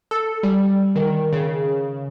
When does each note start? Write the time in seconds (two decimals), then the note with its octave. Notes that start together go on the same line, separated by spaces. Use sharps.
0.11 A4
0.43 G3
0.96 D#3
1.33 C#3